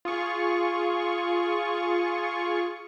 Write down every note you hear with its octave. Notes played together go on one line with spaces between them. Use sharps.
F4 G#4 C#6